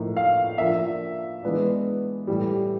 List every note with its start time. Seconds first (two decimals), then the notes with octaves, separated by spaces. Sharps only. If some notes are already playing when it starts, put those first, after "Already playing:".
Already playing: A2 F3 A#3 D#4
0.17 F5
0.58 F3 A#3 D4 E5
1.43 E3 G#3 B3 D4
2.27 A2 E3 G3